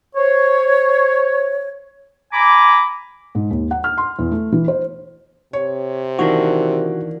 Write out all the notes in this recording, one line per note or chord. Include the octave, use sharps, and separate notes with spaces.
C5 C#5
G#5 A#5 B5 D6
G#2
D#2
F#5
F6
C6
E2
A3
E3
C5
C3 C#5
D#3 E3 A#3 D4 F#4